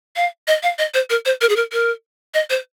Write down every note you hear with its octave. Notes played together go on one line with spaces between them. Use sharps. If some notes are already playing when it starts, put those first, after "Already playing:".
F5
D#5
F5
D#5
C5
A#4
C5
A#4
G#4
A#4
A#4
D#5
C5